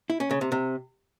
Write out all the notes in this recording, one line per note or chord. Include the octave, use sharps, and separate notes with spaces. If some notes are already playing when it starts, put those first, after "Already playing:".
E4
C#4
C#3
C3
C3